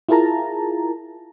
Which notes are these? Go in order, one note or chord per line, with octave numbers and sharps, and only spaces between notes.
E4 F4 G#4 A#4 A5 A#5